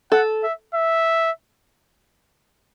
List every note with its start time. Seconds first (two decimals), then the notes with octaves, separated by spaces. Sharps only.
0.12 A4 F#5
0.44 E5
0.75 E5